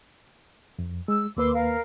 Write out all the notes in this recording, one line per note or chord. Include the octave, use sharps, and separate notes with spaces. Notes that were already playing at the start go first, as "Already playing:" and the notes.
F2
G#3 E6
D#2 A#3 B4 C6 D6 E6
A#4 F5